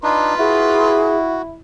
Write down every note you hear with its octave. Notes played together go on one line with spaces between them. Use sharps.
D4 D#4 F4 B4 C6
E4 F#4 G#4